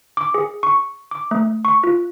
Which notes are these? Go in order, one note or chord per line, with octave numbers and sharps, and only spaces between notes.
D6
G#4
C#6
D6
A3
C#6
F4